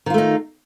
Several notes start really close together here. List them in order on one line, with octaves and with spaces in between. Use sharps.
D#3 F4 A3 D#4